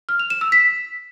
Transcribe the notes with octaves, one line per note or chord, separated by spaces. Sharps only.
F6
F7
E7
E6
B6